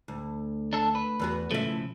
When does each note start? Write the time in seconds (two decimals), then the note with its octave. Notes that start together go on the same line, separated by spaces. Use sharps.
0.08 D2
0.73 D4 A4
0.95 B4
1.19 E2 B3 F#4
1.51 B1 C#3 F3 A3 E4